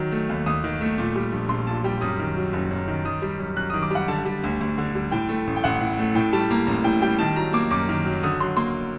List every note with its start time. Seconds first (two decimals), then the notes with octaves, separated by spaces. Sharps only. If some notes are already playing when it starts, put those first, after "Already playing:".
Already playing: D#3 F#3
0.12 A3
0.29 D#2
0.46 D#2 D#6
0.64 D#3
0.81 A3
0.98 A#2
1.16 G3
1.32 A#1
1.49 A#1 C6
1.67 A#2 A5
1.84 G3 G5
2.01 F#2 D#6
2.19 D#3
2.36 F#3
2.53 F#1
2.71 F#2
2.88 D#3
3.05 D#3 D#6
3.22 G3
3.40 F#2
3.56 F#2 F#6
3.70 D#3 D#6
3.82 D6
3.91 G3 F#5
4.08 D3 A5
4.25 G3
4.43 D2
4.61 D2
4.78 D3
4.95 G3
5.12 A2 G5
5.29 A3
5.47 A1
5.56 G5
5.64 A1 F#5
5.81 A2
5.99 A3
6.15 A2 G5
6.33 G3 A5
6.51 A#3 A#5
6.67 A1 A#5
6.84 A2 G5
7.02 G3 G5
7.19 D#3 A5
7.36 F#3 A#5
7.53 A#3 D6
7.70 F#2 D6
7.89 D#3
8.05 F#3
8.23 D3 D#6
8.40 F#3 C6
8.57 A#3 C6